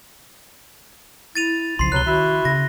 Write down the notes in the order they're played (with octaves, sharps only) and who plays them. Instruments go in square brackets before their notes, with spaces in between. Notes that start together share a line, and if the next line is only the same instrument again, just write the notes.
[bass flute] E4 [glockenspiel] A6 D#7 F7
[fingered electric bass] B1 C#3 [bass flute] F3 [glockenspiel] C6 C7
[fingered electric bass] C#2 C3 [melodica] F#3 B4 [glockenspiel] F#6 G7
[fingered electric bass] D#3 [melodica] E4 E5 [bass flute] F#4
[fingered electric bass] C#3 [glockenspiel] A#6